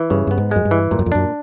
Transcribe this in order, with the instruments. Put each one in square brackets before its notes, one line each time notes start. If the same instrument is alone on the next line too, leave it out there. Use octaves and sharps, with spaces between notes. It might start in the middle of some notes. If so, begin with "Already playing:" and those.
Already playing: [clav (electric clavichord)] E3
[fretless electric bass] G2 [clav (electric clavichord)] C#3
[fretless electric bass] G2 [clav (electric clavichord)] B3
[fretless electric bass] G#2
[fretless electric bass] F#2 [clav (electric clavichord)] G#3
[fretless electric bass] G2
[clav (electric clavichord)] E3
[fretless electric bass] G2 [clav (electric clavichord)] A#2
[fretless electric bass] F#2
F2
[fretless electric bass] F#2 [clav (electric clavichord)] D4